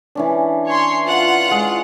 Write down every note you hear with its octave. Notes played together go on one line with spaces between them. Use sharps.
E3 C#4 D4
C#5 C6
F4 F#5
G#3